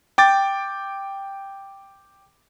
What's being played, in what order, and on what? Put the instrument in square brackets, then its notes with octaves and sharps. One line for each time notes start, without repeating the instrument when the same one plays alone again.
[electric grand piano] G5 D6 A6